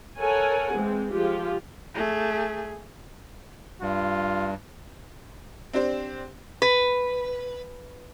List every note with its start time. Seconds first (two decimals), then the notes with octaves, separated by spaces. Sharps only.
0.19 A4 A#4 C#5 F#5 G#5
0.73 E3 G#3 C4
1.10 F3 G#3 F4 G4
1.95 A3 G#4
3.82 G2 F4
5.73 C4 D4 G4 C5
6.62 B4